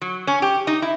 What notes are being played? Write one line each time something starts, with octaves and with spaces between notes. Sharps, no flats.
F#3
C#4
G4
D#4
E4